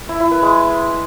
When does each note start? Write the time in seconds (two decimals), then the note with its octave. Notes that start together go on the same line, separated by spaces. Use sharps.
0.09 E4
0.20 E4
0.31 B4
0.42 G#3